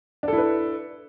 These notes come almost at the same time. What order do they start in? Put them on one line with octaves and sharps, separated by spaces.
D4 A4 E4 B4